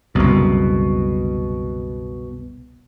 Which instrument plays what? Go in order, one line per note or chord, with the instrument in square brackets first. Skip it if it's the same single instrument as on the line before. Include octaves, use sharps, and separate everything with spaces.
[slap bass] F#1 C2 [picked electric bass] B2